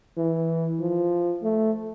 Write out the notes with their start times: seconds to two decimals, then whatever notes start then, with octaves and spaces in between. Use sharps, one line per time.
0.17 E3
0.80 F3
1.43 A3